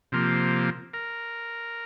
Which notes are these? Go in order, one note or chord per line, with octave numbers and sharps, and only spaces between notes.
C3 F3 A#3
A#4